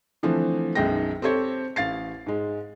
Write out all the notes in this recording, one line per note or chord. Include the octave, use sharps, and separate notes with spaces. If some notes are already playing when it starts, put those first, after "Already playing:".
D3 E3 F3 A3 C4
B1 F#2 D#3 G#3 G5 A#6
C4 G4 A4 C5 C#5
A1 F5 A6 C7
G#2 G#3